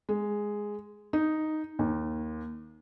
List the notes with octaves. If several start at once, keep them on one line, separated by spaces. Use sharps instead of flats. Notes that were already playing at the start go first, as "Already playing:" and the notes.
G#3
D#4
D#2